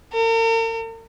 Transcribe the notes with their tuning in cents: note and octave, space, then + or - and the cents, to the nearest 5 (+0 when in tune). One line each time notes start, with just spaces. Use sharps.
A#4 -45